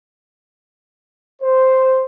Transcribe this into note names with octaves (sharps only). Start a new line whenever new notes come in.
C5